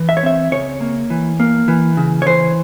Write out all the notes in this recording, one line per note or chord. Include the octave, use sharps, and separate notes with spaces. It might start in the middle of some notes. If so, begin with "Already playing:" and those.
Already playing: E3
E5
C#5
C4 E5
C#3 C#5
A#3
E3
A#3
E3
C#3
C#5
E3 C5